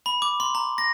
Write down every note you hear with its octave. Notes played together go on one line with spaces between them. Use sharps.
B5
D6
C6
A#5
A#6